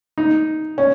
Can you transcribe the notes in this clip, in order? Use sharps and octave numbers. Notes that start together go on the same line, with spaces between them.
D#4
C#4